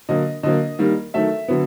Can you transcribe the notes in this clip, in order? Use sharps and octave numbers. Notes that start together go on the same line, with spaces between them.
D3 F#3 A#3 D#5
D3 F#3 A#3 D#5
D#3 G3 A#3
D#3 F#3 A3 E5
D3 F#3 B3